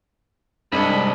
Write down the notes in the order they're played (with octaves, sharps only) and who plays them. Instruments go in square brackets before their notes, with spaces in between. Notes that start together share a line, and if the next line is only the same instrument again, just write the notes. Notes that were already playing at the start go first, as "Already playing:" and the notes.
[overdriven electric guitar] C2 [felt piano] G2 G#3 C#7 [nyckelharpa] D4 D#5 [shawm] B5